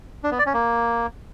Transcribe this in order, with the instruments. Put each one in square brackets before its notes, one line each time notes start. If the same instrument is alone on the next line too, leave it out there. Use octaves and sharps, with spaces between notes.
[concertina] D4
B3
D5
C#4
A#3